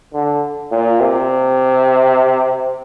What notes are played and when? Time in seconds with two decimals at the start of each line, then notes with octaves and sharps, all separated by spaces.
0.14 D3
0.71 A#2
1.00 C3